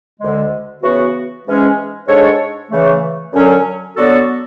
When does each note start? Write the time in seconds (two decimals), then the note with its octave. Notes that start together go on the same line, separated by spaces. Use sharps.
0.20 D2 D3 G#3
0.82 C#3 E3 B3 F#4
1.45 G#2 E3 G#3 C#4 G#4
2.08 G#2 G#3 D4 A4 C#5
2.71 C#3 E3 A3
3.33 F#2 D3 F#3 C#4
3.96 D3 F#3 B3 F#4 A4